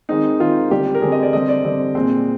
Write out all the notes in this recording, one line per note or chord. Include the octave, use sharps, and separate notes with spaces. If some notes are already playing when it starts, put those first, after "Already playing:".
D#3 G#3 C4 D#4
D#3 G#3 C4 F4
D3 G3 C4 G4
A#4
D3 G3 C4 G#4
D#5
D5
D3 G3 C4 D#5
D5
D3 G3 C4
A#2 G#3 C4